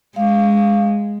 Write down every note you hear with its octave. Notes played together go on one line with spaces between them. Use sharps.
G#3 F5